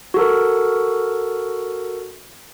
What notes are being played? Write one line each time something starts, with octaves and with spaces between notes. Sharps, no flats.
F#4 A4 A#4